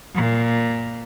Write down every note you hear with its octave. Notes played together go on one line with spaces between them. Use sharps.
A#2